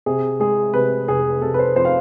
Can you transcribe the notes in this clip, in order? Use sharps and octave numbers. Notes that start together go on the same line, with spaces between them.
C3 G#4
G#3 G#4
C3 B4
F1 G#4
C3 A4
B4
C5
F2 C5
F5